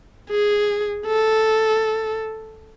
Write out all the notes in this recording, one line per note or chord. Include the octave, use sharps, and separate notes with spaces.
G#4
A4